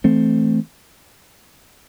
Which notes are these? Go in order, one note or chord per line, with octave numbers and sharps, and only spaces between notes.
E3 A3 C4